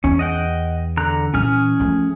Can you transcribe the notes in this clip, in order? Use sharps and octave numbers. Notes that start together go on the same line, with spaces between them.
E2 C#4
D#5 F#5 G5
D3 A#5 F#6
A#2 E3 C#4 G#4 F6
F3 A3